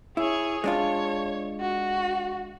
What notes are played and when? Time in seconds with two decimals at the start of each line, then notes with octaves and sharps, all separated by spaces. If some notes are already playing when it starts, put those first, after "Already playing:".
0.17 E4 G#4 C#5
0.64 G#3 D4 F4 C#5
1.60 F#4